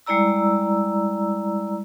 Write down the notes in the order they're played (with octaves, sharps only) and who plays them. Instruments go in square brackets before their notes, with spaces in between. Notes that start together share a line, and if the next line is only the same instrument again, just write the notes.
[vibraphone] G3 G#3 E4 D5 A#5 E6